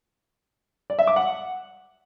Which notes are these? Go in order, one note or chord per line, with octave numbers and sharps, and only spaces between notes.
D5
E5
D6
F#5